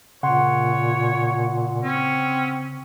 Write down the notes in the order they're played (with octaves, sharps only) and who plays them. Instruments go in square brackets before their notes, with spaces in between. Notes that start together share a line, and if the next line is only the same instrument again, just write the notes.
[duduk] A#2 [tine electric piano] C#3 [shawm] C#5 [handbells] F#5 C6
[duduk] C4 [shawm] C#4